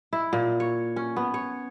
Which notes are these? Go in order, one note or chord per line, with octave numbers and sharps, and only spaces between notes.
E4
A#2
C#5
C#4
B3
C#5